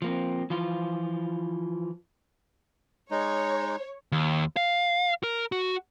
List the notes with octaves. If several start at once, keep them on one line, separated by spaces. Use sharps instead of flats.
F3 A#3 C4
E3 F3 F4
G#3 D#4 C#5
D#2
F5
A#4
F#4